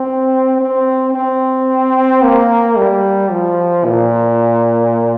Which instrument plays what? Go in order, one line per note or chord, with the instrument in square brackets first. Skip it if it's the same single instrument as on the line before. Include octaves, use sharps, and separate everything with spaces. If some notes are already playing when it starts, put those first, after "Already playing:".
Already playing: [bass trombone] C4
C4
C4
A#3
G3
F3
A#2